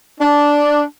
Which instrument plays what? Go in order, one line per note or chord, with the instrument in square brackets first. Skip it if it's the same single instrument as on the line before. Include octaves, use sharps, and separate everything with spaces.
[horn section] D4